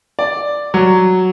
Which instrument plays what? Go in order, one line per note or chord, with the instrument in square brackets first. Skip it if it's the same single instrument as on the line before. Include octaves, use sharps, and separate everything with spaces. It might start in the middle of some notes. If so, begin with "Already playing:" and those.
[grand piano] D5
F#3